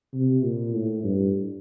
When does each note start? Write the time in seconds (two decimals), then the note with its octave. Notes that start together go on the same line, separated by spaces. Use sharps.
0.14 C3
0.44 A#2
0.74 A2
1.04 G2